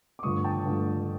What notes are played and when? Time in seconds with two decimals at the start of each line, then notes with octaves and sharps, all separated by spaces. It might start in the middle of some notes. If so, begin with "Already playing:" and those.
0.19 D6
0.23 G2 D3 F3 A3 C#6 D#6
0.44 G5 A5
0.65 G2 D3 F3 A3